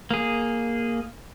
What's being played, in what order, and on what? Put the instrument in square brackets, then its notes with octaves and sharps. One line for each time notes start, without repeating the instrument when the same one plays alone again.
[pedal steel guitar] A#3 G#4